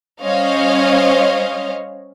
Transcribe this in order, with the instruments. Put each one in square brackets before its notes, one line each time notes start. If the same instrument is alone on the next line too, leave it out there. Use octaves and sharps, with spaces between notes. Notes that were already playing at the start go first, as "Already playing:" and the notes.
[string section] G3 C#4 C5 C#5 D#5 F5